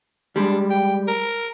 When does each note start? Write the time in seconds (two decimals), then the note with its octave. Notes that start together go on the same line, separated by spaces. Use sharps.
0.36 G3 G#3 D4
0.70 G5
1.08 A#4